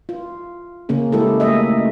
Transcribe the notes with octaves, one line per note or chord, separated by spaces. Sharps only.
F4
C#3 A#3 C#4 G#4
G#3 E4 G4 A4
A3 A#3 G4 D#5 E5